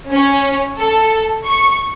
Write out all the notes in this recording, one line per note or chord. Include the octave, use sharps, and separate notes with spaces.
C#4
A4
C#6